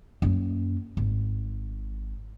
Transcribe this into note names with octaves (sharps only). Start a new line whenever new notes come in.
F#2 A#3
G#1